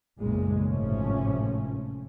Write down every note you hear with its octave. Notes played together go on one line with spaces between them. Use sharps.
F#1 B1 A#2 C#3 G#3
G#1 A2 C3 F3 A3 C#4